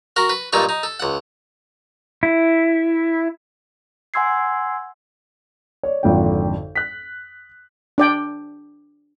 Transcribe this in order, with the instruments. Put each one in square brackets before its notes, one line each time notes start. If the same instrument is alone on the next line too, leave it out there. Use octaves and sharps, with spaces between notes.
[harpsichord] F#4 A#4
B4
G2 A#2 D#4 A4 C#6
D#4
A4
C#2 F#5
[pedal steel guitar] E4
[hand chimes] F#5 G#5 C6 E6 G#6 C7
[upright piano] C#5 D5
G#1 F2 D3 G5
F#6 B6
[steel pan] D4 D5 G5